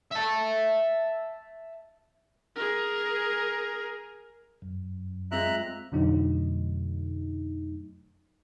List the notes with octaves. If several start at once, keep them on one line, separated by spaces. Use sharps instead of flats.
E5 A5
G#4 A#4
F#2
G#3 C4 F4 E5 A#5 F#6
F2 B2 D3 F#3 A3 D#4